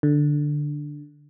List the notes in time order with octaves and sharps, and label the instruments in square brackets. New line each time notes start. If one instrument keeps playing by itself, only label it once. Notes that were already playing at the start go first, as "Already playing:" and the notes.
[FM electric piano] D3